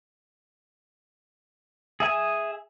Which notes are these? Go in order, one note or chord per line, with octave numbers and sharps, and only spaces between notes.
G#4 E5 G#5